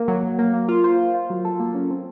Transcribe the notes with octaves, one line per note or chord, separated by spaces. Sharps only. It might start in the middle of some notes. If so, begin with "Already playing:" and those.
Already playing: A#3
F#3
F#3
A#3
A#3
F4
C5
C5
F4
F#3
A4
A#3
C#4
C4